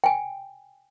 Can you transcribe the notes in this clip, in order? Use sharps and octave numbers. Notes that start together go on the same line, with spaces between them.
G5 G#5